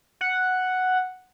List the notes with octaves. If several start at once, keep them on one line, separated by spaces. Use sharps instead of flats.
F#5